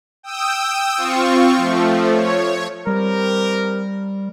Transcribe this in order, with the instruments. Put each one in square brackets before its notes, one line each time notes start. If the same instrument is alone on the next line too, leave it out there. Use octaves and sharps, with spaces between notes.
[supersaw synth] G5 D#6 E6
C4 F4 C#6
F3 A3
C#5
[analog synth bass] G3 [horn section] C4 G4 A#4